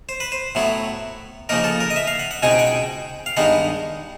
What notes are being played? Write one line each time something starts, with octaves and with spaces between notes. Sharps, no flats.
C5
B4
C5
A2 F#3 B3 E4
C#3 F3 A#3 D#4 A#4
A4
A#4
D#5
E5
F5
F#5
F#5
C#2 B2 G#3 C4 D#4 G#5
G5
F#5
G5
F5
G2 D#3 G#3 B3 D#4 F#5